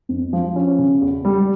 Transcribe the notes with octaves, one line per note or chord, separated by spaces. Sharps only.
F2
F3
C#4
C#3
E2
G3